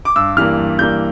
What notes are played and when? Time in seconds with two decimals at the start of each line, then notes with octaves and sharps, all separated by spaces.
0.05 D6
0.16 G2 E6
0.37 E3 G3 A#3 F6
0.58 G2
0.79 E3 G3 A#3 G6